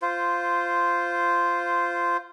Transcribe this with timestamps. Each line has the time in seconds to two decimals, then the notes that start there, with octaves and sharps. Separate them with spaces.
0.02 F4 C5